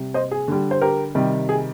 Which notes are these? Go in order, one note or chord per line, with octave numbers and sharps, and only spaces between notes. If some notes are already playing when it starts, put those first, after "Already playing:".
Already playing: C3 G3
C5 D#5
G#4
D3 G3
C5
G4 A#4
C3 D#3 G3
G#4